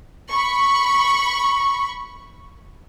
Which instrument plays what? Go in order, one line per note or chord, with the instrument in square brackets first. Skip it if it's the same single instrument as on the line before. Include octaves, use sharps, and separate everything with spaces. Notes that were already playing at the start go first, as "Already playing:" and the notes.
[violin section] B5 C#6